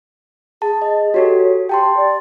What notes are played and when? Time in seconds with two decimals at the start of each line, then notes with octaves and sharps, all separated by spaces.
0.62 G#4 A5
0.82 D#5
1.14 F#4 G4 A4 C#5
1.69 G4 G5 A5 C6
1.97 D5